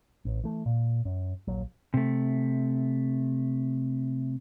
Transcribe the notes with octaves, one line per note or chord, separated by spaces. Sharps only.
A1
E3 A3
A#2
F#2
A#1 D#2 F#3
C3 A3